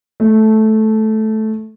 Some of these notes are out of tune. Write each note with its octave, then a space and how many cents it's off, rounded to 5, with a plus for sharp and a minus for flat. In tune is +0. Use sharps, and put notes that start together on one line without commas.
A3 -10